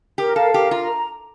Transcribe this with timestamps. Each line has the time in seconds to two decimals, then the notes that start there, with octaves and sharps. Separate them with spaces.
0.18 G4 A#4
0.36 A4 F5
0.54 G4 A#4
0.71 F4 A#5